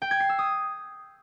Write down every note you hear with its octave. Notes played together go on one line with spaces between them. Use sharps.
G5
G#6
C7
E6
D#6